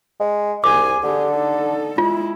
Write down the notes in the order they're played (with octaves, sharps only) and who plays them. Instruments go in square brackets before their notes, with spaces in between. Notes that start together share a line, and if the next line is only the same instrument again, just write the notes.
[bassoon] G#3
[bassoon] C2 [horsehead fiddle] G#4 G#5 [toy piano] D6
[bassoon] D3 [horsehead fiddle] G4 G#4
[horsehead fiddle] D#4 A4
[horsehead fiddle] G#3 E4 [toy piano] F4